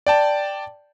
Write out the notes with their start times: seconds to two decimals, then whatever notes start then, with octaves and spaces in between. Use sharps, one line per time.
0.07 D5 G5 A5